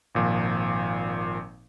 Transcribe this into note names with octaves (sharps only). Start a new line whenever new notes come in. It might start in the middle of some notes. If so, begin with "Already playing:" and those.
G#1 A#2 F3